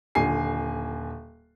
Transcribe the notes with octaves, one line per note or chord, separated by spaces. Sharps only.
D#1 D3 G#5 C7